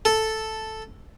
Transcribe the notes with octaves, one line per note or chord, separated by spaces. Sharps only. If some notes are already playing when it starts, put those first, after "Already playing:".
A4